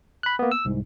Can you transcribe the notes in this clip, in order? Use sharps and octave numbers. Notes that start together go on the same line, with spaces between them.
B5 F#6
A#3 B3
E6
C2 G#2